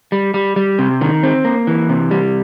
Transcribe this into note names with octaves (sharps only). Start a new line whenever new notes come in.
G3
G3
G3
C3
D#3
C4
A#3
E3
C3
G3